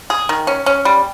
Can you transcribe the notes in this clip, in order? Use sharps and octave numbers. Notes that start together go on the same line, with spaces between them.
G#4
D#3
C#4
C#4
G3